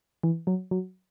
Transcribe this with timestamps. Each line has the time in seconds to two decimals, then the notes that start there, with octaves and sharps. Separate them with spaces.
0.23 E3
0.47 F#3
0.71 F#3